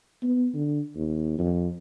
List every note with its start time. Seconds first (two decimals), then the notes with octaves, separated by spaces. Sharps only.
0.23 B3
0.54 D3
0.96 D#2
1.39 F2